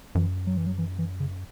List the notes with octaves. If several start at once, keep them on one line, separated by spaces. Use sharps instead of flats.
F#2 E3
F#3
E3
F#3
E3
E3
C#3